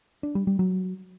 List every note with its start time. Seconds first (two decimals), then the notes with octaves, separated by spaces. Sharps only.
0.23 D4
0.35 G3
0.47 G3
0.59 F#3